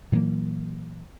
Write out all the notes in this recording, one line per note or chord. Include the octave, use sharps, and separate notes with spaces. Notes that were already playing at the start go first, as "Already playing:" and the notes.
A#2 E3 F#3 A#3